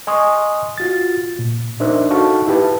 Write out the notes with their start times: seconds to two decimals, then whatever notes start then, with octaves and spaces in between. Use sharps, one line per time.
0.07 D#5 G#5 C6 C#6 D#6
0.78 F4 F#4 A6
1.39 A#2
1.80 D4 D#4 A#4 C5 D5 E5
2.11 D#4 F#4 A4 F5 A5 C#6
2.47 E4 G4 B4 A5